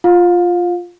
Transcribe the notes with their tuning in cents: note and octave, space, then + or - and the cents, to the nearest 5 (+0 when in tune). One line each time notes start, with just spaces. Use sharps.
F4 +0 F5 +30